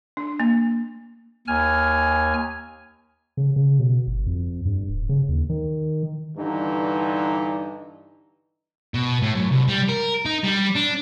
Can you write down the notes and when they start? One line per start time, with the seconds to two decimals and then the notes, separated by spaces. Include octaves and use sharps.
0.17 D4
0.40 A#3
1.48 D#2 G#5 F6
3.37 C#3
3.56 C#3
3.79 B2
4.07 G1
4.27 F2
4.65 G2
4.89 D1
5.09 C#3
5.29 D#2
5.50 D#3
6.37 G2 D3 E3 D#4
8.94 B2
9.22 A2
9.36 F#2
9.52 C2
9.69 G3
9.89 A#4
10.25 D#4
10.44 G3
10.75 D4